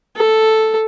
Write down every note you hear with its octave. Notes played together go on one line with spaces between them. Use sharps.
A4